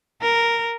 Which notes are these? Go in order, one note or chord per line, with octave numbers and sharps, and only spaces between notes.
A#4